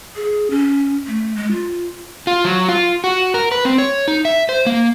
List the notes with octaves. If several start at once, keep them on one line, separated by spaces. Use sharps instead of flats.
G#4
C#4
A3
G#3
F4
F4
F#3
F4
F#4
A#4
B4
C4
C#5
D#4
E5
C5
A#3